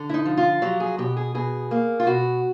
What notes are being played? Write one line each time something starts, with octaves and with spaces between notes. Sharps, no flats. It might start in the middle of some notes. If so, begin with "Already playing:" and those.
Already playing: D3
E4
D#4
F3
F4
F#3 G4
G#4
B2 G4
G#4
B2 G#4
A#3
F4
B2 F#4